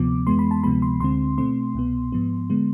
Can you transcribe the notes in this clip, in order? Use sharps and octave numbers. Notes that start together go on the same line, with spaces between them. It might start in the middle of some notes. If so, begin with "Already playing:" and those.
Already playing: D2 C3 F3 B3 D6
F2 E3 G#3 B3 C6
B5
A5
D2 C3 F3 G#3 B3 B5
C6
D2 D3 G#3 C4 C6
B2 A3 C4 C6
C2 B2 B3
G#2 F3 B3
D3 G#3 B3